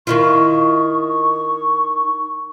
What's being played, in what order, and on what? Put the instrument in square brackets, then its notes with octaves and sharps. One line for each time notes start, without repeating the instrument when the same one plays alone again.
[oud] D#3 E4 F4 [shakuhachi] C#6